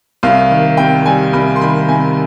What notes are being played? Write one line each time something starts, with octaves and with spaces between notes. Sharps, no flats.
C2 F5
D#3
C3 G5
G3 G#5
C2 B5
C6
D#3 B5
C3 G#5